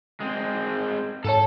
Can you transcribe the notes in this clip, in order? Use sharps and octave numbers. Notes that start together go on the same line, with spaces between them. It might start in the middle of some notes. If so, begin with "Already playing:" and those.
G#3 C4
G#2 A4 C#5 A5